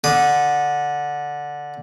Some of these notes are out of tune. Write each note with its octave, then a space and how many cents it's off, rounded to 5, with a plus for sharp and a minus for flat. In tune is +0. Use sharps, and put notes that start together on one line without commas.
D3 -5 D#6 -25